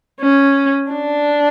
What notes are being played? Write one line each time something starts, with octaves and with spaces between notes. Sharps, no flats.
C#4
D4